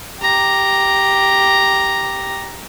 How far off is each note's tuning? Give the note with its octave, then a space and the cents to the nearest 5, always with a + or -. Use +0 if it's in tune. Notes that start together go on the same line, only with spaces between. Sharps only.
G4 +0 A#5 +0